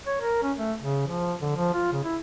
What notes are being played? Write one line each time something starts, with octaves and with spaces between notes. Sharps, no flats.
C#5
A#4
C#4
A3
C#3
F3
D3
F3
F4
C#3
E4